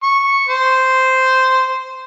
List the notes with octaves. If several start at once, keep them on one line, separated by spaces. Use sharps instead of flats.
C#6
C5